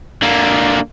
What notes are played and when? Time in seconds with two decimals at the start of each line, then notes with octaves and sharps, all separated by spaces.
0.22 D3 A#3